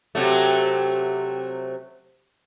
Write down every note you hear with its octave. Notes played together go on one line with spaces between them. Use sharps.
C3 F#3 A3